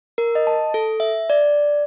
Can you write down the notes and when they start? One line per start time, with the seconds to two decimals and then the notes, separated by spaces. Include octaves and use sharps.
0.18 A#4
0.35 D#5
0.47 A5
0.74 A4
1.00 E5
1.30 D5